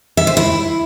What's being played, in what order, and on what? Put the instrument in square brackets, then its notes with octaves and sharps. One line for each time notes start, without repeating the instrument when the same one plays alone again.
[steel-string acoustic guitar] E5
C5
E4